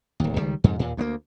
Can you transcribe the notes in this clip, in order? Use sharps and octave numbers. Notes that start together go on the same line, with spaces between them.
D1 D#2
C#2 D#3 G3
F2 G#2 C3
D#2 A#2
D2 G#3 A#3